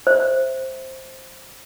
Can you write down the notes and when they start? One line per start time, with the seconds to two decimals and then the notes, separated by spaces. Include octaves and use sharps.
0.07 C5 E5